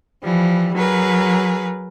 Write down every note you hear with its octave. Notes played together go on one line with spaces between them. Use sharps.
E3 F3 G3
F#3 G#4 A#4 B4